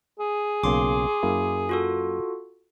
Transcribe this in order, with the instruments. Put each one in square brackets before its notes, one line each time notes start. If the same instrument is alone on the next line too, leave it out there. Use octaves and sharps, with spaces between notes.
[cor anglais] G#4
[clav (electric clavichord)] B1 C#3 A#3 [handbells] C6 D6
[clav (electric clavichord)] F#2 A#3 E4
[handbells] F4 F#4 A4